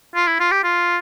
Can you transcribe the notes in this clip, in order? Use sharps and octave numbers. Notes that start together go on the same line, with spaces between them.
F4
E4
F4
G4
F4